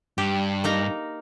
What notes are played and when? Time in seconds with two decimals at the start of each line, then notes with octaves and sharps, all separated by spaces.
0.18 G2 G4
0.64 A#3 D#4 A#5